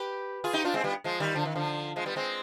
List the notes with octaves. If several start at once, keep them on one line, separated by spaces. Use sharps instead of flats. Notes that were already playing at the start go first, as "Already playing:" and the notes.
Already playing: G4 B4
F4 G#4
D#4 G4
D4 F4
G#3 C4
G3 B3
F3 G#3
D#3 G3
D3 F3
D#3
D3 F3
F3 G#3
G3 B3
G#3 C4